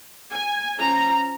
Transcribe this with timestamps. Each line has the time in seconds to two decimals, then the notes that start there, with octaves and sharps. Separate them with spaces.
0.31 G#5
0.77 F3 C#4 A#5